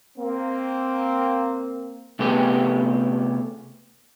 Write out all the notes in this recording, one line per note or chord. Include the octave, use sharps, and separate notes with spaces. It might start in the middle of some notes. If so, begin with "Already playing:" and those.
A#3 C4
C3 A3 B3 G4 G#4